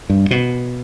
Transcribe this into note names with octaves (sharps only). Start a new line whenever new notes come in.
G2
B2